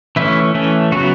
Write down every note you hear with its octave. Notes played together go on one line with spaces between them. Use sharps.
E3 A3 C#4 E4
E3 A3 C#4
C#3 F#3 B3 F#4